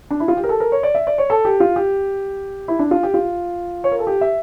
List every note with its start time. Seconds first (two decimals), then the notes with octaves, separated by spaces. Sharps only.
0.11 D4
0.20 E4
0.28 F4
0.37 G4
0.44 A#4
0.49 A4
0.60 A#4
0.72 C#5
0.83 D5
0.95 E5
1.07 D5
1.18 C#5
1.30 A4
1.45 G4
1.60 F4
1.76 G4
2.68 E4
2.79 D4
2.91 F4
3.03 G4
3.14 F4
3.84 C#5
3.92 A#4
3.99 A4
4.07 G4
4.21 E5